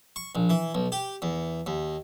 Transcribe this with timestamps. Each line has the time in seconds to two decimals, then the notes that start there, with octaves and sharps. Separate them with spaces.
0.16 C#6
0.35 A#1
0.50 E3
0.75 B1
0.92 G4
1.22 E2
1.66 D#2